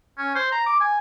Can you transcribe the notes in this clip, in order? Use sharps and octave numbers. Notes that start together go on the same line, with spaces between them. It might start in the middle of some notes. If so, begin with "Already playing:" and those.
C#4
C5
A#5
D6
G#5